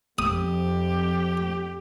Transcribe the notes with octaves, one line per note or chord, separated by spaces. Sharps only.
F2 G4 D#6